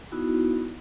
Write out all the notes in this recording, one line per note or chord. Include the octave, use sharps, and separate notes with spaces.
B3 D#4 E4 F#4